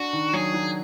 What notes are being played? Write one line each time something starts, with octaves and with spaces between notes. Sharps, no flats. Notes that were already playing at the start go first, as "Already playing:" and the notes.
Already playing: D4 F#4
D#3
F#3 G#4
F#3